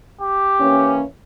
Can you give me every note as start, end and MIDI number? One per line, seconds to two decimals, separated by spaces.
0.21 0.96 67
0.60 1.03 52
0.60 1.03 58
0.60 1.03 61